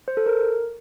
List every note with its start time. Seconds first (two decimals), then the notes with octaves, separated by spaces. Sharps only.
0.08 C5
0.17 A4
0.26 A#4